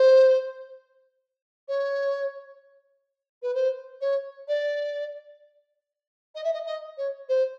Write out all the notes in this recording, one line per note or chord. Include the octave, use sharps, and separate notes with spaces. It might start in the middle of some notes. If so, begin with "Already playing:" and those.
Already playing: C5
C#5
B4
C5
C#5
D5
D#5
E5
D#5
D#5
C#5
C5